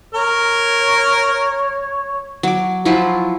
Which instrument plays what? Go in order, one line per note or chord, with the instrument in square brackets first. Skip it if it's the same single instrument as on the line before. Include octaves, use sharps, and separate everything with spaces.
[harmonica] A#4 [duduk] C#5
[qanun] F#3 D6
F3 F#3 E4 F4